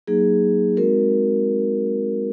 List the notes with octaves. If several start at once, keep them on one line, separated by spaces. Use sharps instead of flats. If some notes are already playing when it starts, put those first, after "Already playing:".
F#3 A#3 D#4 G#4
G#3 C4 D#4 F#4 A#4